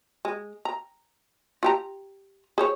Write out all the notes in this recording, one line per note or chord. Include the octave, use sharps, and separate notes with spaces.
G#3
A#5
F4 G4 A#5
G#4 C5 C#5